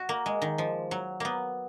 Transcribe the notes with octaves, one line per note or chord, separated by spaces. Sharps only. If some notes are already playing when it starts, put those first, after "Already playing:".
Already playing: F#4
A#3
G#3
D#3
F3
F#3
A#3 B3